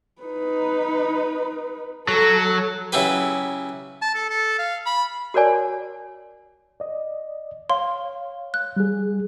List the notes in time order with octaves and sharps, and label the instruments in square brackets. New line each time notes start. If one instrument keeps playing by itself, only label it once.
[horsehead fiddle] D#4 B4
[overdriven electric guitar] F#3 [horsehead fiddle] A4
[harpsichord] C#3 F#3 E4 G4 B4
[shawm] A5
A4
A4
F5
B5
[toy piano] F#4 A#4 C#5 D5 G#5
[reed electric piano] D5 D#5
[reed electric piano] C#5 F5 [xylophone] C6
[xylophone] F#6
[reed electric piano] G3 G#4